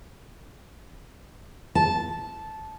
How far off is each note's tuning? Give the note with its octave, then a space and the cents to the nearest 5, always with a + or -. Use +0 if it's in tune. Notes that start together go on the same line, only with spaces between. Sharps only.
A5 -10